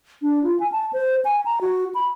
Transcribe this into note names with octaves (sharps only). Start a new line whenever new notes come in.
D4
F4
G#5
A5
C5
G#5
A#5
F#4
B5